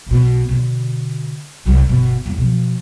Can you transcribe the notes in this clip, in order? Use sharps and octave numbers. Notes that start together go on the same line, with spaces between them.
B1 B2
B2 D3
C2 G3
G1 B2
E2 G2
B2 F3